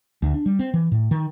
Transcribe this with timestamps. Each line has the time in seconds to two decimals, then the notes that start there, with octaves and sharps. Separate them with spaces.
0.22 D2
0.34 D4
0.46 G3
0.59 C4
0.74 E3
0.92 A2
1.11 D#3